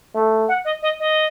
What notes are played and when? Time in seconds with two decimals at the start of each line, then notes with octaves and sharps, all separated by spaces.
0.15 A3
0.48 F#5
0.64 D#5
0.82 D#5
0.99 D#5